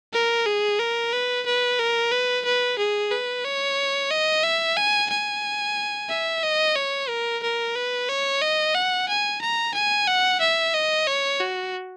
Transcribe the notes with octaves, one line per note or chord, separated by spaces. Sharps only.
A#4
G#4
A#4
B4
B4
A#4
B4
B4
G#4
B4
C#5
D#5
E5
G#5
G#5
E5
D#5
C#5
A#4
A#4
B4
C#5
D#5
F#5
G#5
A#5
G#5
F#5
E5
D#5
C#5
F#4